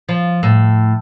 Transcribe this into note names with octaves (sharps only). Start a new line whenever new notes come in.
F3
A2